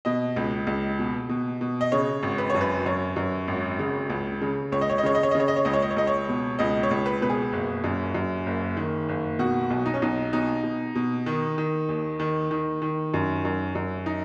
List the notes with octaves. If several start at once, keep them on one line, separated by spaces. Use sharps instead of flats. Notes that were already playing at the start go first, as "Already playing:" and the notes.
B2 D#5
C#2
C#2
B2
B2
B2
D#5
C#3 C#5
G#1
B4
F#2 C#5
B4
F#2 C#5
F#2
G#1
C#3
C#2
C#3
C#2 C#5
D#5
C#5
D#5
C#3 C#5
D#5
C#5
D#5
C#3
C#5
D#5
C#5
C#2 D#5
C#5
D#5
C#5
C#2 D#5
C#5
B2
C#2 D#5
C#5
C#2
B4
B2 B4
G#4
F#1
F#2
F#2
F#1
D#3
F#1
B2 F#4
B1
D#4
C#4
B1 D#4
B2 D#4
B2
B2
D#3
D#3
D#2
D#3
D#3
D#3
F#2
F#2
F#2
D#4